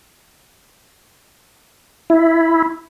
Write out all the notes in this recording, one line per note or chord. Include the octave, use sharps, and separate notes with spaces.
E4